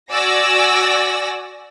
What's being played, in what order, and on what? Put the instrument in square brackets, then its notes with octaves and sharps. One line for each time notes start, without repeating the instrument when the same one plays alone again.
[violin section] F#4 D5 G#5 E6 A#6